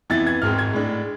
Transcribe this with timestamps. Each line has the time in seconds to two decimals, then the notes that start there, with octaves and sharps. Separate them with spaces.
0.10 F2 E3 B3 E4 A6
0.27 G#6
0.42 G#1 G#2 G#3 C4 F6
0.58 G#6
0.73 A2 G#3 D4